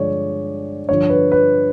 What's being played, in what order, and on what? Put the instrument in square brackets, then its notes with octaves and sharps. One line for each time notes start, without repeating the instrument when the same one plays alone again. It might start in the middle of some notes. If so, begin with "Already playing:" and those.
Already playing: [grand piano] G2 D3 F3 G#3 C#5 D5
G2 D3 F3 C#5
B4
B4